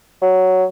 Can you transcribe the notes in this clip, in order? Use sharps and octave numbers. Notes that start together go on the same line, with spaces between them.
F#3